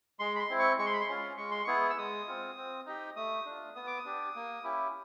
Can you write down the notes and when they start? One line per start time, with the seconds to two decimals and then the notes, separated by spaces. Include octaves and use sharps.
0.19 G#3 C6
0.36 B5
0.39 C6
0.50 C4 E4
0.59 C#6
0.78 G#3 C#6
0.86 C6
0.93 B5
1.01 C6
1.09 C#4 F4
1.37 G#3 C#6
1.51 C6
1.64 B3 E4 G#4 C#6
1.90 E6
1.98 G#3 D#6
2.28 C4 F4
2.57 C4
2.86 D#4 G4
3.16 A3 D#6
3.46 D4 F4
3.75 B3 D#6
3.87 D6
3.97 D#6
4.05 D4 G4
4.35 A#3
4.64 C#4 E4 G4